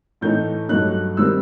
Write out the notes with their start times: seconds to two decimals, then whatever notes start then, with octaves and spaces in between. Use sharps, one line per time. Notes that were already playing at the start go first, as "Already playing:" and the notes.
0.21 A2 E3 A3 D#4 G6
0.69 G2 F#3 A3 D#4 F#6
1.17 D#3 G3 C4 E6